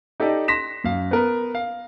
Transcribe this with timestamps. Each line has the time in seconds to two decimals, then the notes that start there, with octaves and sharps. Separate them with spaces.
0.20 D#4 G4 A4 D5 D#5
0.48 C6 A#6 B6 E7
0.84 F#2 F5
1.11 B3 A#4 B4
1.55 F5